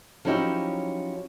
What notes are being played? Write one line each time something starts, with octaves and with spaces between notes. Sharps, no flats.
F3 F#3 C#4 D#4 E4 G4